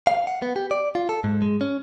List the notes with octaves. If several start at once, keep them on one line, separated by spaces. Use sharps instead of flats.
F5
F#5
B3
G4
D5
F4
A4
G#2
G#3
C#4